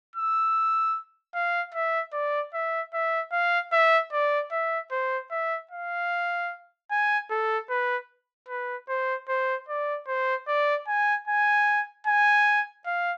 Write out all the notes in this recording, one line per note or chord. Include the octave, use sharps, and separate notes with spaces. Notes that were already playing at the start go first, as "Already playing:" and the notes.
E6
F5
E5
D5
E5
E5
F5
E5
D5
E5
C5
E5
F5
G#5
A4
B4
B4
C5
C5
D5
C5
D5
G#5
G#5
G#5
F5